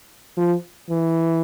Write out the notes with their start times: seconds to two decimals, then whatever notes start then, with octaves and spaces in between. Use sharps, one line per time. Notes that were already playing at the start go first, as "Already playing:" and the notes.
0.38 F3
0.90 E3